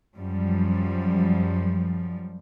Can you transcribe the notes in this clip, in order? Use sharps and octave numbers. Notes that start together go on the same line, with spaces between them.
F#2 F3 G3